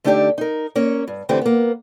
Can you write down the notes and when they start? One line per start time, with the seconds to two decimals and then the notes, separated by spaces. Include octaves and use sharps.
0.04 D3 A3 D4 D#4 G4 D5
0.38 D#4 A#4
0.75 A#3 C#4 C#5
1.08 G2
1.29 D3 E3 A3 C4 G4
1.41 A#3 B3